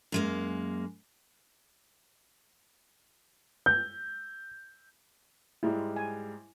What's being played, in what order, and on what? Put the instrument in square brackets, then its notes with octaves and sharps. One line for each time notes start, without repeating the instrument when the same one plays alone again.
[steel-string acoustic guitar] F#2 G#3 A#3
[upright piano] G6
[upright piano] G#2 G3 G#3 [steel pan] E4
[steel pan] G#5